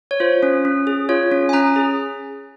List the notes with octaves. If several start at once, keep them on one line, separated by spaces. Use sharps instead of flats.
C#5
F4 C5
C#4
C#4
G#4
F4 C#5
C#4
G#5
C#4 A#5
G#4